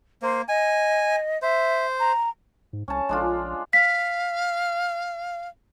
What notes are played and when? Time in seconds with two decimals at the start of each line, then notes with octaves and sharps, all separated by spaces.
0.22 A#3 C5
0.48 D#5 G#5
1.42 C5 E5
2.00 A#5
2.73 G#2
2.88 C2 C#4 A5
3.09 A#1 G#3 D4 F4
3.73 F5 B6